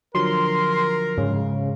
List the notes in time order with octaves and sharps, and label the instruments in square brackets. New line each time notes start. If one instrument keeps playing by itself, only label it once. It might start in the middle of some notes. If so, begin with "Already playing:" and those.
[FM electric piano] D3 F3 F#3 [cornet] A#4 [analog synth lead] C6
[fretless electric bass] G#2 [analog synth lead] C#3